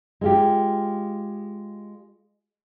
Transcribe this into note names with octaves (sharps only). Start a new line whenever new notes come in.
G#3 F4 G4